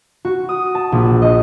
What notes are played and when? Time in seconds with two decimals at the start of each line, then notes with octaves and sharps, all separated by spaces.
0.25 F#4
0.49 D#6
0.75 A5
0.92 A#1
1.22 D#5